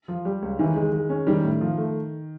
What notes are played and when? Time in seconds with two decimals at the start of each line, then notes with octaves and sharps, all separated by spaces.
0.08 F3
0.25 G3
0.42 C#2
0.59 D#3 E3
0.76 G#3
0.93 G#3
1.09 C#4
1.27 D#3 G3
1.44 A2
1.61 F3
1.77 A3